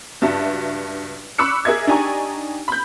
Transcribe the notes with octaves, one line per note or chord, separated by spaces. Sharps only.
C#2 G2 F#4 E5 A5
B5 C#6 D6 E6 F#6 C#7
G#4 A#4 D#5 E5 G#6
D4 D#4 G4 G#5 A#5 C#6
B5 G6